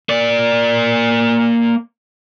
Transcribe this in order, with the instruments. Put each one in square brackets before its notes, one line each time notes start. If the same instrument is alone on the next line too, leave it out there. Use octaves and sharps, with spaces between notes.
[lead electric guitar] A#3 D5